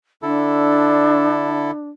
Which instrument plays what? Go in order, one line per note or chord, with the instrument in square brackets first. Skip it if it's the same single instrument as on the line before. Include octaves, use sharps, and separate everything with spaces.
[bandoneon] D3 E4 A4 [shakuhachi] D4